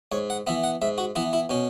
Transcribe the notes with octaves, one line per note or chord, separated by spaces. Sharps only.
G#2 C#5
F#5
E3 B3 E5
F#5
G#2 E5
F#4
E3 B3 E4
E4
B2 C#4